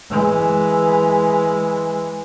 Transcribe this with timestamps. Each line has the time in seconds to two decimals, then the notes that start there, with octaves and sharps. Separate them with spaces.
0.10 E3 G#3